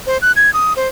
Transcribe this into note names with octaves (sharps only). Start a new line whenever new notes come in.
C5
F#6
G#6
D#6
C5